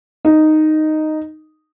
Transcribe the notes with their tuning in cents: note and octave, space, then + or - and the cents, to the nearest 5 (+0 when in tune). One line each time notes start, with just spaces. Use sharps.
D#4 -5